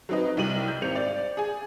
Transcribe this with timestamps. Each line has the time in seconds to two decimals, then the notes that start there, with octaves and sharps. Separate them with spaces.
0.09 F#3 C4 D#4 B4 D#5
0.37 C2 G3 D#5 G5 D#7 F#7
0.68 G6
0.82 G#1 C4 C#7 F7
0.95 D5
1.37 G#4 G#5